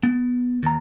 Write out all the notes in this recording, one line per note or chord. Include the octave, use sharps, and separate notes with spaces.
B3
D#2 A#5